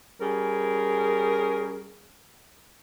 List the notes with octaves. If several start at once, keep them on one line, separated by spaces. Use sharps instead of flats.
G3 C#4 G#4 A#4